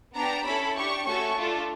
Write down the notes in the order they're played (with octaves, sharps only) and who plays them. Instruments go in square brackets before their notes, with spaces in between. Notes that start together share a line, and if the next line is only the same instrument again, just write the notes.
[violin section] B3 D4 G4 A#5
C#4 E4 A4 B5
D4 G4 C#6
A3 C#4 F#4 A4 C#6
A3 D4 F4 A4